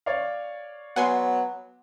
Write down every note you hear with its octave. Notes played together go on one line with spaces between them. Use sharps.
C#5 D5 F5
F#3 B3 F#5 G#5 C6